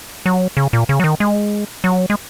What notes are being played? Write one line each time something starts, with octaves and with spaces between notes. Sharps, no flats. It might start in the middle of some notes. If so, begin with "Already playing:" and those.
F#3
C#3
A#2
C#3
F#3
D#3
G#3
F#3
G#3